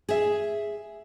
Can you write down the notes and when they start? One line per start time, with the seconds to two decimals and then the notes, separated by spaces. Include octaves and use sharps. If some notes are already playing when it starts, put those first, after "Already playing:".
0.09 G#4 E5